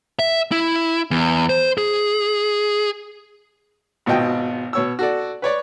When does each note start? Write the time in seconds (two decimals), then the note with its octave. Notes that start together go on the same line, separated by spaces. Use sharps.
0.19 E5
0.52 E4
1.11 E2
1.49 C5
1.78 G#4
4.06 G#1 B2 F4 D#5 G5
4.73 B2 C#5 E6
4.99 F#4 A4 D5
5.42 B4 C#5 D5 C#6